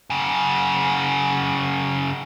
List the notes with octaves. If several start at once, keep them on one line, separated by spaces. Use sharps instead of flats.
F#2 C#3